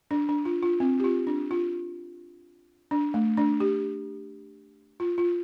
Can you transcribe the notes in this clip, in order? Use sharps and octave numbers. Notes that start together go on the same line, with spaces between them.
D4
D4
F4
F4
C4
G4
F4
D4
F4
D4
A3
D4
G4
F4
F4